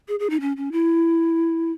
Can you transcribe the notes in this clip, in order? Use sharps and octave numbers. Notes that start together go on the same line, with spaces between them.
G#4
G#4
D#4
C#4
C#4
E4